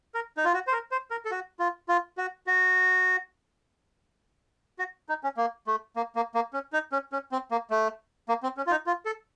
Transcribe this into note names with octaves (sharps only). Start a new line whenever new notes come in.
A#4
D#4
F4
F#4
C5
A#4
C5
A#4
A4
F#4
F4
F4
F#4
F#4
F#4
D#4
C#4
A#3
A3
A#3
A#3
A#3
C#4
D#4
C#4
C#4
C4
A#3
A3
A#3
C4
C#4
F4
D#4
F4
A4